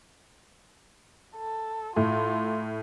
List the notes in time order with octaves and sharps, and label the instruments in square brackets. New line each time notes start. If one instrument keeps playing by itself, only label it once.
[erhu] A4
[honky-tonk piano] A2 [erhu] F4